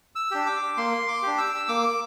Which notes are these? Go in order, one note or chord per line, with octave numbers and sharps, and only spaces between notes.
E6
D4 G4
D6
A#3 C6
D6
D4 G4
E6
A#3 D6